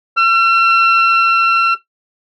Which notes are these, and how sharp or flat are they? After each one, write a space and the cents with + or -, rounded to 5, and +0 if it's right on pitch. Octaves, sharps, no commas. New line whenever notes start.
E6 +45